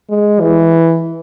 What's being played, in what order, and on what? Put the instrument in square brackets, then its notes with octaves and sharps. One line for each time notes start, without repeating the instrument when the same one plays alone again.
[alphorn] G#3
E3